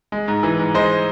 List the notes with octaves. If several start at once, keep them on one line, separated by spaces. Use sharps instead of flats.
G#3
G#2
E3
G#2
G#3 C5 D#5